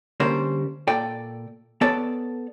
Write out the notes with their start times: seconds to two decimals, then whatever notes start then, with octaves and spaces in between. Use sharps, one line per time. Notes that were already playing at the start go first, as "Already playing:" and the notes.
0.20 D3 G3 A#3 C#4 A#4 C5
0.87 A#2 A4 D5 G5
1.81 B3 A4 C#5 D5 A5